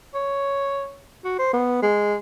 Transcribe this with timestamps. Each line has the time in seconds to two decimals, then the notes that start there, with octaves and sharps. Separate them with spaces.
0.14 C#5
1.24 F#4
1.39 C5
1.53 B3
1.82 G#3